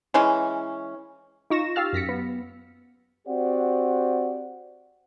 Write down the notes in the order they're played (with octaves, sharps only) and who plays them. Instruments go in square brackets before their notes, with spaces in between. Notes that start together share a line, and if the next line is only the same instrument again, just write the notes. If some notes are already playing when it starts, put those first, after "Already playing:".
[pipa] E3 G#3 C#4
[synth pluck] D#4 F4 C#6 A#6 E7
G4 F5 E6 F6 A6
F#2 A#6 B6 C#7
B3
[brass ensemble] C4 F#4 G4 C5 D5 F#5